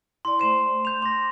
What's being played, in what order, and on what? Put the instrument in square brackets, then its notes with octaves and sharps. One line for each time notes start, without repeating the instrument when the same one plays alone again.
[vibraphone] E4 D5 [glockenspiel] C6
[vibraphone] A3 C5 [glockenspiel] C6 E7
[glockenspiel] G6 F7
[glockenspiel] C6 A#6 [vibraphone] D6